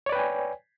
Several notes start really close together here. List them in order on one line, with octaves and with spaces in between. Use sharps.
C#5 D5 B4 G5 G#5